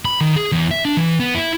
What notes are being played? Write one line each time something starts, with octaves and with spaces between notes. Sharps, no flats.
B5
D#3
G#4
E2
E5
D4
E3
B3
E4